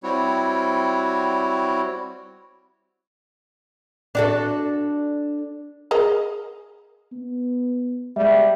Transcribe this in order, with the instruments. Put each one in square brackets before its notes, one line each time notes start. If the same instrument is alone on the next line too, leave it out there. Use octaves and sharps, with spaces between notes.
[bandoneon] G3 C4 E4 F#4 C#5
[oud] D4 F#4 A4
[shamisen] G#4 A#4 D#5
[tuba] B3
[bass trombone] G3 [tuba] G#3 [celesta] E5